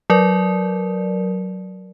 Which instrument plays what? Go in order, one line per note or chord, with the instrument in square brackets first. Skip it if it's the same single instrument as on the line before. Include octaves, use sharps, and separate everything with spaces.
[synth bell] F#3 A#4 D5